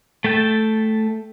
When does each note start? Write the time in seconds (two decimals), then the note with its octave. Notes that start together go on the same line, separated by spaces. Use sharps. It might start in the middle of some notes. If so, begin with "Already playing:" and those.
0.24 A3 A4 G5 A5